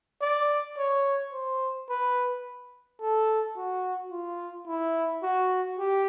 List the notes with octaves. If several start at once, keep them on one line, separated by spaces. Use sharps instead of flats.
D5
C#5
C5
B4
A4
F#4
F4
E4
F#4
G4